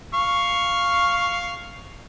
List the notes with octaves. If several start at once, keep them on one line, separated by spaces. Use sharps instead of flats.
F5 C#6